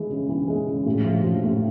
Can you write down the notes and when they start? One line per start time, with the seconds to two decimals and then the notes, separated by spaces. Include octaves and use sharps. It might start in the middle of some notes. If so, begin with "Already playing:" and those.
Already playing: E3 G#3
0.09 C#3
0.29 E3
0.48 G#3
0.66 C#3
0.86 A2
1.04 F3
1.24 F3
1.44 A2